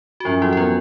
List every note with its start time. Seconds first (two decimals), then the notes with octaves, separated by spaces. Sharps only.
0.20 F#4
0.25 F#2 F3 F4
0.41 E3 F#3 E4
0.53 E4
0.57 F3 B3 F4